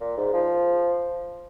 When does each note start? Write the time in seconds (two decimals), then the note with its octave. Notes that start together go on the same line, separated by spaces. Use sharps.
0.01 A#2
0.18 G#2
0.33 F3